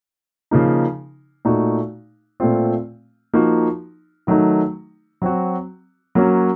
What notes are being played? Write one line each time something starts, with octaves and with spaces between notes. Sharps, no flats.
C#3 F3 A#3 D#4
A#2 A3 D#4 F#4
A#2 A3 C4 F4
F3 A#3 D#4 F#4
D#3 F#3 A3 D#4
F#3 C4 F#4
F#3 A#3 C#4 F#4